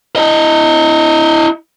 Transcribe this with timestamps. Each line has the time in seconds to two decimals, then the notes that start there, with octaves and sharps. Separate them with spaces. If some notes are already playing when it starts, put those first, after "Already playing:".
0.16 E4 D#5